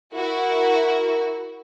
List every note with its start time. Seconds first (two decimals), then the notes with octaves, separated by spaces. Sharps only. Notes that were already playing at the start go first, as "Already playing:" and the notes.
0.14 E4 F#4 A#4